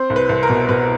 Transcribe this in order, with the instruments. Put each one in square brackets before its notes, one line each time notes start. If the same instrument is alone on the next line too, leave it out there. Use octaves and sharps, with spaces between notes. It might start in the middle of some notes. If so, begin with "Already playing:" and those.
Already playing: [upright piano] C4 C5
C2
B4
C2
A#4
B2
B2 B4